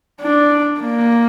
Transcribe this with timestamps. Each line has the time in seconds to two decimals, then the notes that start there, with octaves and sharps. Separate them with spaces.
0.21 D4
0.81 A#3